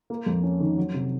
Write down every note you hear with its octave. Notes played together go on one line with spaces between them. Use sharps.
A#3
F2
C#4
D#3
F#3
C3